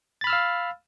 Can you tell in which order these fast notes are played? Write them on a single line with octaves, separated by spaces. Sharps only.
A6 B5 F6 E6 F5